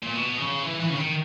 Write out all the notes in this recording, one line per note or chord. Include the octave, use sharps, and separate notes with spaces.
A#2
B2
C#3
E3
E3
C#3
D#3